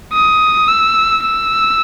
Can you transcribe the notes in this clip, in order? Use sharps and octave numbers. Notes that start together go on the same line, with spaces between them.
D#6
E6
E6